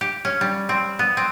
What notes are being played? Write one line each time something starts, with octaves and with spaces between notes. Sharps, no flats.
G4
C#4
G3
C4
B3
C4